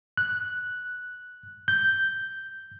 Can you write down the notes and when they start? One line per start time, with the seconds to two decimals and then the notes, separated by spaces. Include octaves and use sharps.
0.17 F#6
1.68 G6